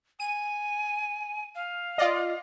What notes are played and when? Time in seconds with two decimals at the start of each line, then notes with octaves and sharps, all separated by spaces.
0.20 G#5 D#7
1.55 F5
1.98 F4 D5 D#5